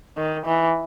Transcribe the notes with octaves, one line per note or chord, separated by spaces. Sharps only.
D#3
E3